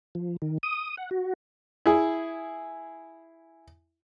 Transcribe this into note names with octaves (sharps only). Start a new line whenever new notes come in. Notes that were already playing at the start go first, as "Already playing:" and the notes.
F3
D#3
D#6
F#5
F#4
E4 G#4